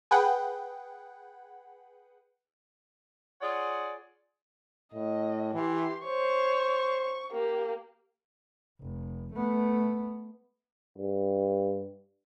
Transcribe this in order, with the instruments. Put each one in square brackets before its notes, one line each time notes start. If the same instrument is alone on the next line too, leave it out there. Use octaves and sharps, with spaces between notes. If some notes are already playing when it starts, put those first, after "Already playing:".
[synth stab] G#4 B4 F#5 G5
[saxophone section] F4 G#4 C#5 D5 F#5
[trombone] A2 [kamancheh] D#5
[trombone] E3 [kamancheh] G4 C6
[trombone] C5 [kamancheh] C#5 C#6
[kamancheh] C#6
A#3 G4
[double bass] F1
A3 B3
[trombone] G2